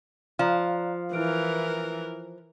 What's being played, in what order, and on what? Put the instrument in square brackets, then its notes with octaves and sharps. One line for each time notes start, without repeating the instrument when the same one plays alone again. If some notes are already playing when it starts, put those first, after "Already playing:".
[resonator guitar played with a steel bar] F3 [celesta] D5 A#5 F#6 [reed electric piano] F5
[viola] E3 A#4 [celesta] E4 F6 D7